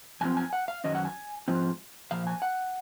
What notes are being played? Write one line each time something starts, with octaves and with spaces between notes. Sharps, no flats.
F#2 C#3 F3 C4 G#5
G#5
F#5
F5
F#2 D#3 F#3 C#4 D#5
F#5
G#5
G#2 F3 C4 F4
A#2 F3 F5
G#5
F#5